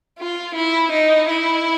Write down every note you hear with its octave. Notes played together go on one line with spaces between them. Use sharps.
F4
E4
D#4
E4